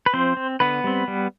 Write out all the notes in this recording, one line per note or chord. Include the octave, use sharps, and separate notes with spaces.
B4
F3 C4 C5
C4
D3 B3 B4
G3 C4
G3